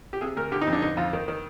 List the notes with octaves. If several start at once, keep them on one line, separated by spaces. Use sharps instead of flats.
G4
C3 G#4
D2 A#4
D3 G4
D#4
F2
D4
D3 D#4
F2 F4
D#3
D#3